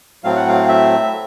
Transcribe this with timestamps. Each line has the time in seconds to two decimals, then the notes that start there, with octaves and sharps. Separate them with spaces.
0.24 A2 F#3 A3 C4 F5
0.36 F#5
0.49 F5
0.63 F5
0.69 E5